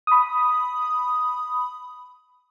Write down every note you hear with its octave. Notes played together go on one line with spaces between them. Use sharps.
B5 D#6